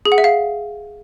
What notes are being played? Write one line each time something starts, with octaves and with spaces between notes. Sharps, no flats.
G#4
F#5
E5
F5